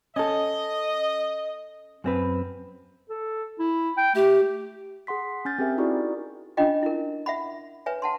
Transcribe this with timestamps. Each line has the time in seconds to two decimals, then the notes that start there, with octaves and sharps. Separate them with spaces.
0.16 C#4 A4 D#5
2.04 F#2 C4 B4
3.10 A4
3.59 E4
3.98 G5
4.15 A3 G4
5.07 G#4 F#5 C6 B6
5.45 C#4 G#5 F6 G6 A6
5.59 C4 G4 G#4 A#4 E5 G#5
5.78 D#4 E4 F#4 G#4 A#4 D5
6.57 C#4 D4 F4 D#5 G5
6.83 E4 A#4
7.26 E5 F#5 B5
7.86 B4 C#5 E5 G#5
8.02 F#5 A5 C6